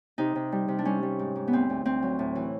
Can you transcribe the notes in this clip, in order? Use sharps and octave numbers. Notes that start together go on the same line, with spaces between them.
C3 D#4
C3
G3
C3
D4
G3 C#4
G3
G#2
G#2
B3
D2 C4
D2
D2 C4
F#3
A2
E3